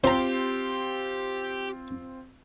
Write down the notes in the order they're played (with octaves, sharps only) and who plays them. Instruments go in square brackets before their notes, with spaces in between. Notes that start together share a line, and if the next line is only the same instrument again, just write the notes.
[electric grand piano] C4 F4 C6 [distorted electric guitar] G4 [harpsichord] C5 A#5